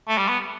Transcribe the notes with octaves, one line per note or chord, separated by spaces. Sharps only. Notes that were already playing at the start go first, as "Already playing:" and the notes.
A3
G3
B3